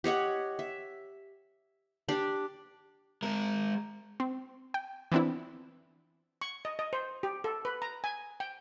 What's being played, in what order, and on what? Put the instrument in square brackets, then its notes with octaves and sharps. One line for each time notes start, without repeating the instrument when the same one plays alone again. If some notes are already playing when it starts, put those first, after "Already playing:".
[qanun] G4 C#5 D#5 F#5
E5
D4 G4 D5
[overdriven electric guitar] G#3 A#4
[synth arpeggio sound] C4
G5
E3 B3 C4 D4 E4
[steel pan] C#6
D#5
D#5
C5
G4
A4
B4
A#5
G#5
G5